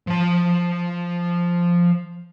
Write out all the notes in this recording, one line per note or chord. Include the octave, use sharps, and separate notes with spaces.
F3 A5